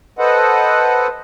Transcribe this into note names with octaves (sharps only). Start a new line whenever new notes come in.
A4 B4 C5 D#5 F#5